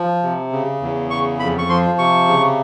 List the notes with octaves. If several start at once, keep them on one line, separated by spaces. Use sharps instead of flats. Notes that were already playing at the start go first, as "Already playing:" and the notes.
Already playing: F3
C3
C#3
E2
C#3 C#6
F2 B5
C#6
F3 C6
C3 C#6
C#3